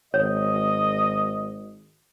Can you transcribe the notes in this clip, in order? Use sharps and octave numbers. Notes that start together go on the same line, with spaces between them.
G#1 C#5 D#5